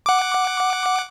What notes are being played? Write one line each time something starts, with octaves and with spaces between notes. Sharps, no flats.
F#5 D6